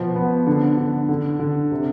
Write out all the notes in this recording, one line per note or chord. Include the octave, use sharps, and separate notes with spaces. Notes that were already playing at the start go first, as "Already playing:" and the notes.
Already playing: B2 F3 B3
B3
D3
D3
D3
D3
C3